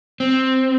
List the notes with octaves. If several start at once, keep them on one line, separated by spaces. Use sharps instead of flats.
C4